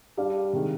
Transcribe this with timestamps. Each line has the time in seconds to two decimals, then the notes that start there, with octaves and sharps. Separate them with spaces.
0.17 G3 D4 G4 D5 F5
0.53 C3 D#3 G#3